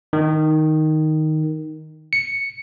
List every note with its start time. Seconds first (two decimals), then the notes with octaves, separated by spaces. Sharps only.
0.13 D#3
2.13 C#7